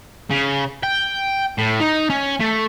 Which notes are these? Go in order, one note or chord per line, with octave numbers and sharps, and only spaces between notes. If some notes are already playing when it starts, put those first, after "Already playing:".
C#3
G5
A2
D#4
C#4
A3